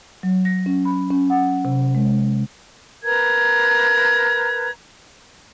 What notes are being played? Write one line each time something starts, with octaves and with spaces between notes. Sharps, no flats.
F#3
A#6
C#4
B5
C#4
F#5
C3
G#3
A#4 B4 A#5 G#6